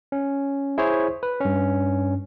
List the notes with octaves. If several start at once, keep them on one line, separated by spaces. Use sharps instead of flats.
C#4
E4 G#4 C5 C#5
B4
G2 C#4